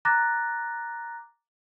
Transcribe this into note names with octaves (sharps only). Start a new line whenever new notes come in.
A#5 D6 F#6 A6 A#6